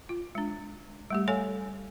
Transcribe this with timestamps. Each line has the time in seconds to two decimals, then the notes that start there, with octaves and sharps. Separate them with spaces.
0.09 F4
0.35 G#3 D4
1.10 G3 A3 G4
1.28 A4 C#5 F5 G#5